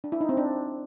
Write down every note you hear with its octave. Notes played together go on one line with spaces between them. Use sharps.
D4
E4
D#4
C4
D4